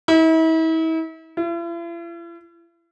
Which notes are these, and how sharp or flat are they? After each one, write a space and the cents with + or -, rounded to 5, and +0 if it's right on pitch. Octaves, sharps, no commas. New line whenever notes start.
E4 -40
E4 +45